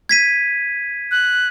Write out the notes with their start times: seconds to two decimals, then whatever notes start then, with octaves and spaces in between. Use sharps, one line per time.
0.09 G#6 B6 D#7
1.11 F#6